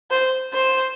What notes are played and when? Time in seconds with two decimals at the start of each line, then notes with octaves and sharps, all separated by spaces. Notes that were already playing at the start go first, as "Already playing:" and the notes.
0.11 C5
0.54 C5